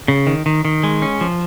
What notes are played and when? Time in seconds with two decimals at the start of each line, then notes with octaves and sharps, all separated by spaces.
0.08 C#3
0.27 D#3
0.46 D#3
0.65 D#3
0.83 G#3
1.02 C#4
1.21 F3